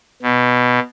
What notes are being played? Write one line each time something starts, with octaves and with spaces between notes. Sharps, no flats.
B2